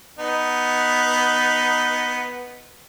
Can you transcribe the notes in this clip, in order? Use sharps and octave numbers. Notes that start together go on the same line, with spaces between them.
B3 D#4